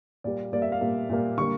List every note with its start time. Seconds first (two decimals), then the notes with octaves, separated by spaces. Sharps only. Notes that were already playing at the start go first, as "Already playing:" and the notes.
0.24 A#2 G3 A#3 D5
0.53 A#2 G3 A#3 D5
0.62 E5
0.72 F5
0.81 A#2 G3 A#3
1.09 A#2 G3 A#3
1.37 D3 G3 A#3 C#6